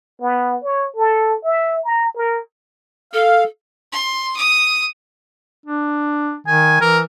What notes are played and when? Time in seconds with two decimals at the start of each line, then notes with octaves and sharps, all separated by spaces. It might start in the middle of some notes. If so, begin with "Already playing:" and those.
0.21 B3
0.64 C#5
0.96 A4
1.44 E5
1.85 A#5
2.16 A#4
3.13 A4 F5
3.92 C6
4.37 D#6
5.66 D4
6.47 D#3 G#5
6.81 E3 A#4